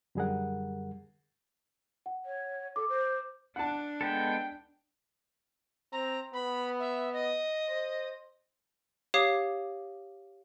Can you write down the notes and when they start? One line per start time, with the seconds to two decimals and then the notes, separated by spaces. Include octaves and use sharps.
0.15 F#2 D3 G3 G#4 A#4 F#5
2.06 F#5
2.26 C#5
2.76 A4 D6
2.89 C5
3.56 D4 F#5 A5
4.01 G#3 B3 A4 G5
5.92 C4 A#5
6.33 B3 B5
6.79 E5
7.13 D#5
7.68 C5
9.14 G4 C#5 F5 D6 D#6 C7